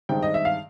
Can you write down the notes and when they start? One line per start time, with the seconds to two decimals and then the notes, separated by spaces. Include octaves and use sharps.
0.09 G2 D#3 G#3 C4 G5
0.23 D#5
0.34 E5
0.45 F5